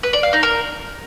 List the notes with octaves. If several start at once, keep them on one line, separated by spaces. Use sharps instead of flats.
B4
D5
F5
D#4
A#4